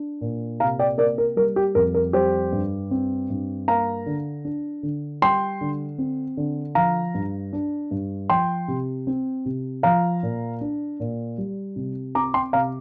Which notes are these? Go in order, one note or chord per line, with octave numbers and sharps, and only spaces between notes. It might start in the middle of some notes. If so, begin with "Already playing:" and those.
Already playing: D4
A#2
C3 F5 A#5
D5 G5
A#3 A#4 D5
A#4
G3 A#4
G4
F2 A#4
A#4
G3 G4 C5
G2
C4
G2
A#3 F5 A#5
D3
D4
D3
G3 G5 C6
D3
C4
D3
F3 F5 A#5
G2
D4
G2
F3 G5 C6
C3
C4
C3
F3 F5 A#5
A#2
D4
A#2
G3
C3
C4 A#5 D6
G5 C6
C3 F5 A#5